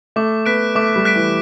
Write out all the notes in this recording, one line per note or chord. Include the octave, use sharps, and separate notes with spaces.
A3 D6
B3 F#6 B6 D7
A3 D6
G3
F#6 B6 D7
E3